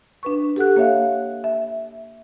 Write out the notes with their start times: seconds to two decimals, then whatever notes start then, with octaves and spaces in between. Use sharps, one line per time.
0.23 D4 B4 C#6
0.56 G4 A4 F#5 F#6
0.76 A#3 C#5 E5 F5
1.44 E5